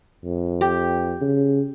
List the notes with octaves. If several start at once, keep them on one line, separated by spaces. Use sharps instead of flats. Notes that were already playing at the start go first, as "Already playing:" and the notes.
F2
G4
C#3